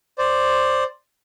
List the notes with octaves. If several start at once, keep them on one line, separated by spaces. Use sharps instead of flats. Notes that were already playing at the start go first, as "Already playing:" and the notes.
C5 D5